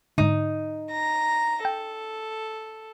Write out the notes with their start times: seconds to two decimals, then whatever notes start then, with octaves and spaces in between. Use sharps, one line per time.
0.18 G#2 D3 D#4
0.92 A#5 A#6
1.65 A4 G5